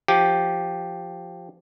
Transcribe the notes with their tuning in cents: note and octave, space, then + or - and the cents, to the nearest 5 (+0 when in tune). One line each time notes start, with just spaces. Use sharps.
F3 +0 G4 +0